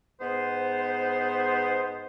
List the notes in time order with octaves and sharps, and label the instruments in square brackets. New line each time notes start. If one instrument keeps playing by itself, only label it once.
[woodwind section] G#2 B3 C5